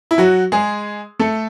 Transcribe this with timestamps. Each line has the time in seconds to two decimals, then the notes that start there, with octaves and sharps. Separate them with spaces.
0.11 E4
0.18 F#3 F#4
0.52 G#3 G#4
1.20 A3 A4